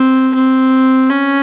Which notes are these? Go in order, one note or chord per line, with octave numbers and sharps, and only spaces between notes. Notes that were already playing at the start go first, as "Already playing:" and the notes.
Already playing: C4
C4
C#4